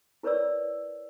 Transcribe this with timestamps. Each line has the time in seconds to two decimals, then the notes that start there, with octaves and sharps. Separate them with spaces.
0.23 E4 A#4 B4 C#5 D5 E6